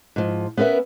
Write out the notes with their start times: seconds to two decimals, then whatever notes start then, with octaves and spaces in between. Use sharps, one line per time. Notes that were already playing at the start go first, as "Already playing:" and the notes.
0.16 G#2 F3
0.57 B3 C#4 A#4 B4 E5